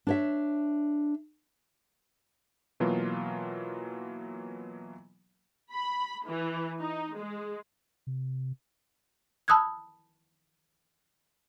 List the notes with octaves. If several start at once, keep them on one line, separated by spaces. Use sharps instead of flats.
D4 C#5 E5
B2 E3 F#3 A#3 F4
B5
E3
D#4
G#3
C3
A5 B5 D#6 E6 F#6 G#6